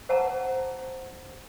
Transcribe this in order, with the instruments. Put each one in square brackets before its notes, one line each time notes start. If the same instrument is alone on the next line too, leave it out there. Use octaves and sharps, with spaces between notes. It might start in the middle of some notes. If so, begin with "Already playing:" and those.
[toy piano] C5 F#5 A5 A#5